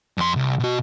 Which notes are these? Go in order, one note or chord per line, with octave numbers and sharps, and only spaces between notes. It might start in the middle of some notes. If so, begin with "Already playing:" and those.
F2 C6
C2
B2 F#4